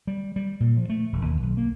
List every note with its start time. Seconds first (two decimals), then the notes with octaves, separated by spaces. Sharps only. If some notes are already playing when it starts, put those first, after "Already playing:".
0.07 G3
0.36 G3
0.60 A#2
0.77 F3
0.89 A3
1.13 E1
1.25 D#2
1.43 B1
1.57 A#3